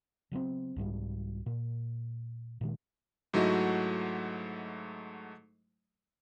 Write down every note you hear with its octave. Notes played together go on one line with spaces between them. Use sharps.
C#3 F#3 B3 C4
C2 G#2 G3 G#3
A#2
A#2 D#3 G#3
G#2 F#3 A3 E4 F#4 D#5